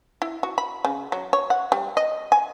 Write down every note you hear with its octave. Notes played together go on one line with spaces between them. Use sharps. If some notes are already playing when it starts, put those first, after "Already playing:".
E4
F#4
B5
C#3
F#3
C#5
F#5
G3
D#5
G#5